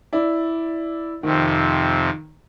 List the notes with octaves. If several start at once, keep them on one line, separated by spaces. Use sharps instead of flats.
E4 D5
F2 C3 D#3